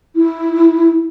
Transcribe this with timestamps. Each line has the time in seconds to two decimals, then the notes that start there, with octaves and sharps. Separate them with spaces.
0.16 E4